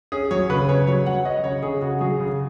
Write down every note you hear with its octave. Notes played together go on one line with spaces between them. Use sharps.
C#4 G#4
F#3 C#5
C#3 B4
C#3 C#5
F#3 C#5
F#3 F#5
C#4 D#5
C#3 C#5
C#3 G#4
C#3 F#4
F#3 G#4
C#3